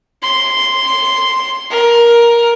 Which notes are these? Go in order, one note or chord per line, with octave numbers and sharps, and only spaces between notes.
C6
A#4